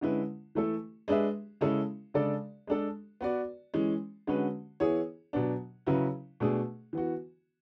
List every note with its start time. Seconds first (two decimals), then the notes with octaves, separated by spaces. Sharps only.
0.01 D3 G#3 C#4 E4 B4
0.55 E3 A3 E4 A4
1.08 G#3 D4 G#4 B4 E5
1.61 C#3 G#3 C#4 E4 A4
2.14 C#3 G#3 D4 A4 D5
2.67 G#3 D4 A4
3.21 B3 F#4 B4 D5
3.74 E3 G#3 C#4
4.27 D3 G#3 C#4 F#4 B4
4.80 E3 B3 E4 G#4 C#5
5.33 B2 F#3 B3 D4
5.87 C#3 F#3 C#4 E4 B4
6.40 B2 A3 D4 G#4
6.93 E3 B3 F#4